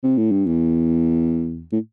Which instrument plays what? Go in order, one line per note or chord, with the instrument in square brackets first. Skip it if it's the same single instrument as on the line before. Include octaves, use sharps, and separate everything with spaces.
[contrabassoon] C3
A2
G2
E2
A2